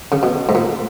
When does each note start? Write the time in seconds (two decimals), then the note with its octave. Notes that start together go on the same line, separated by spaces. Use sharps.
0.12 C#3
0.23 B2
0.49 G#2
0.55 A#2